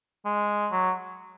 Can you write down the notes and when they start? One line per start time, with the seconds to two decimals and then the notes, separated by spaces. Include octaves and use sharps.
0.25 G#3
0.71 F#3